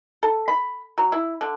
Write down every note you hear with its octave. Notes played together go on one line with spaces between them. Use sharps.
A4
B5
F#3
E4
D3